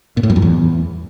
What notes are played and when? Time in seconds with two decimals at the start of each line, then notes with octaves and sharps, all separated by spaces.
0.17 A#2
0.23 A2
0.30 F#2
0.36 F2
0.42 E2